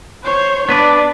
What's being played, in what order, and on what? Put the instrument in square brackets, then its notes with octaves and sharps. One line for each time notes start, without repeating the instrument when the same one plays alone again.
[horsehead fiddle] C5 C#5
[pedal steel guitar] B3 B4 D5 [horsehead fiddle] D4